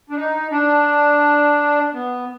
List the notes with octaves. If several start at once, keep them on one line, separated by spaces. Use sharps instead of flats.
D4
D#4
D4
B3